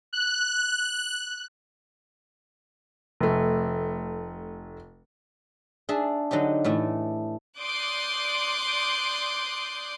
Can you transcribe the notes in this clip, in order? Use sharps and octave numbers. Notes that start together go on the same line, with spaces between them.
F#6
F1 A3
D4 G#4 D5 E5
D3 F#3 D#4 G4
A2 E3 A3 E4
D5 C6 D6 D#6 F#6 G6